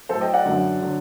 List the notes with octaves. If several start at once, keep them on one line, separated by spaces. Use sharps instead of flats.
A2 F#3 A4 C5
D#5 G5
D5 F#5
F#2 D3 F#3
D3 F#3